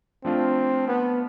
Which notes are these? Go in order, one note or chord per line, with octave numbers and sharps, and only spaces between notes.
F3 A3 C4 D4 F4
B3